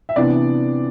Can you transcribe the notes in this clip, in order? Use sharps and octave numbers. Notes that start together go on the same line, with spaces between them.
E5
C3 E3 B3 D4 D5